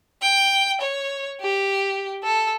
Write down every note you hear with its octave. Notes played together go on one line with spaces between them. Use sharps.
G5
C#5
G4
A4